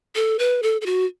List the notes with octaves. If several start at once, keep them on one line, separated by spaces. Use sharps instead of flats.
A4
B4
A4
A4
F#4